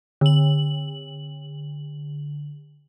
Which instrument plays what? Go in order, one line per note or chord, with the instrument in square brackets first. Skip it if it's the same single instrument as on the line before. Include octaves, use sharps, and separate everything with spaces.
[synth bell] D3 F#7